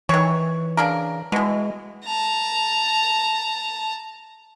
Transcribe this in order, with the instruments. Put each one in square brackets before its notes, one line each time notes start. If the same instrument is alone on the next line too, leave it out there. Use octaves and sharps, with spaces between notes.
[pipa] D#3 C#5 [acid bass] E3
[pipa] C#3 D4 A#4
[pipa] B2 E3 [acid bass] G#3
[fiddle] A5 A#5